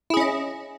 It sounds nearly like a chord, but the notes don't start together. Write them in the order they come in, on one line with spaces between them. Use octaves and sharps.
E4 G#4 C#4 D#5